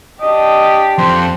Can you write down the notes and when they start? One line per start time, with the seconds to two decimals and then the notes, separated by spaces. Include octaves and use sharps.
0.22 D4 G4 D#5
0.98 F2 C5